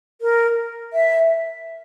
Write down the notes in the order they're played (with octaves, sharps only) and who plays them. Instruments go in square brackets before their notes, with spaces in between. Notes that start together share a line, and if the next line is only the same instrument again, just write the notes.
[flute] A#4
E5